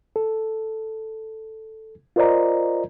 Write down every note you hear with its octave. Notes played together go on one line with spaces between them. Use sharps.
A4
F4 A#4 C5 D5 D#5 A#5